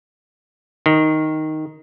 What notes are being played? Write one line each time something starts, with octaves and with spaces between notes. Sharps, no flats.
D#3